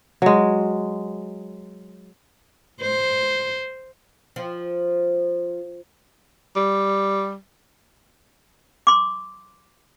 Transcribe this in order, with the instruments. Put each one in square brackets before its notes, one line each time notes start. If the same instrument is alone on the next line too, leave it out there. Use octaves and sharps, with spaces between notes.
[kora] F#3 G#3
[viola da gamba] C5
[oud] F3
[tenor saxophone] G3
[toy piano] C6 D6